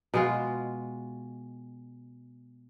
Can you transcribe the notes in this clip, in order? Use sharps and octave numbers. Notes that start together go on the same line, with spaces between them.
B2 G#3 F4